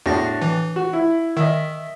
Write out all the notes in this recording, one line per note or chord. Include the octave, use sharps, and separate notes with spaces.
E2 A2 D4 F#4 A#6
E3
F#4
E4
D#3 D#5 E5